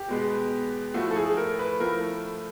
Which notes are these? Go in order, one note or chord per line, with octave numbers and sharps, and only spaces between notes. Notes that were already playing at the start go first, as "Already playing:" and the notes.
Already playing: G4
B2 G#3 B3
A2 F3 A3 F#4
A4
G#4
A#4
B4
A2 F3 A3 A#4